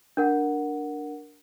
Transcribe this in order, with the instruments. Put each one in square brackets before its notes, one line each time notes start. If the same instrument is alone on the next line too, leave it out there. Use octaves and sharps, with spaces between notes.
[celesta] D4 A#4 F#5